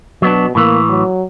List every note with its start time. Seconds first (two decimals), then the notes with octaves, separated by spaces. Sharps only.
0.22 B2 F#3 B3 D4
0.55 A2 E3 A#3
0.89 F#3